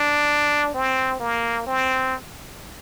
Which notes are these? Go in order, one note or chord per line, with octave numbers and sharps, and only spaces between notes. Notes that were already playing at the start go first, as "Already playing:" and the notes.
Already playing: D4
C4
A#3
C4